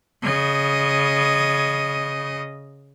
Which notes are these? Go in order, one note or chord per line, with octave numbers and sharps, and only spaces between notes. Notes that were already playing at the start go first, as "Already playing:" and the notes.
C#3 D#5